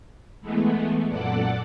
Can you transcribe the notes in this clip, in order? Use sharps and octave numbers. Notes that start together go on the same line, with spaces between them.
E3 G#3 A3 B3
F#2 A#2 A4 D5 F#5 D6